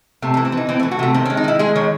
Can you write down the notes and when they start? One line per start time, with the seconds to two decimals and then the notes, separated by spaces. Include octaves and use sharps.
0.22 C3 A3
0.34 A3
0.37 E3
0.45 C4
0.52 E3 D#4
0.69 E3 C4
0.80 A3
0.83 E3
0.91 F#4
0.99 C3 A3
1.14 D#3 C4
1.25 C#4
1.30 G#3
1.37 D#4
1.44 D#3 E4
1.59 G#3 G#4
1.76 D#3 C#5